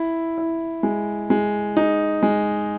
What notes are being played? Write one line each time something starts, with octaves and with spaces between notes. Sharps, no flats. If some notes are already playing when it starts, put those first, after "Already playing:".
Already playing: E4
E4
G#3
G#3
D#4
G#3